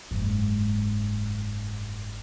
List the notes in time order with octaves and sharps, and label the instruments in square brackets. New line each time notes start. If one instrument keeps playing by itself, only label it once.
[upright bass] F#1 G#2